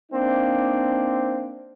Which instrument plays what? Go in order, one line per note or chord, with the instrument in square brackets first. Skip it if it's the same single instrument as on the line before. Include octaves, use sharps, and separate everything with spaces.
[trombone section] A#3 C4 D4 D#4